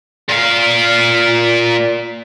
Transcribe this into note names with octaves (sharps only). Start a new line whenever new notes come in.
A#2 F5